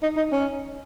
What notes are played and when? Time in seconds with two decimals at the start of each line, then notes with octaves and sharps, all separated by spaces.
0.03 D#4
0.17 D#4
0.32 C#4